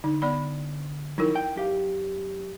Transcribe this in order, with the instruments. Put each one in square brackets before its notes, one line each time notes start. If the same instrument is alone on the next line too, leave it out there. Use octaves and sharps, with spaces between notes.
[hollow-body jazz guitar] D3 [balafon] D#4
[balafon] B3 D5 B5
[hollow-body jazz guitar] D#3 F#3 [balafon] D#4 E4 A#4
[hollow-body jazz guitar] G5
F#2 G4 F5